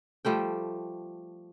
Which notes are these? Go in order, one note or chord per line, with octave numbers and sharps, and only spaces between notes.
F3 G3 A3 G5